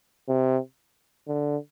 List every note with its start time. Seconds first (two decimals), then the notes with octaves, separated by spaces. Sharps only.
0.28 C3
1.28 D3